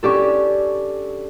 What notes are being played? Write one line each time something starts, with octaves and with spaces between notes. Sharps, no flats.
C#4 D4 G4 A4